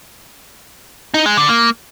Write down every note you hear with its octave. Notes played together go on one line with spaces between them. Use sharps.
D#4
G#3
D3
A#3